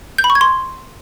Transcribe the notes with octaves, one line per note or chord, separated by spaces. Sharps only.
G6
B5
C#6
G#6
C6